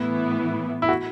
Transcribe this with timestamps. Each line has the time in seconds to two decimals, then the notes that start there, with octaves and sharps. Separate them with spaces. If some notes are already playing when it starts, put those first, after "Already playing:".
Already playing: A2 E3 B3 E4
0.82 E4
0.89 F#4